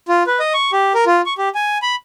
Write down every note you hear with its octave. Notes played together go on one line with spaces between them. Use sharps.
F4
B4
D#5
C#6
G4
A#4
F4
C#6
G4
G#5
B5